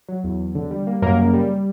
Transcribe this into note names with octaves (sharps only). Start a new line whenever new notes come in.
F#3
E2
E2
D3
G3
A#3
F#2 A#3 A#4
C#3
G3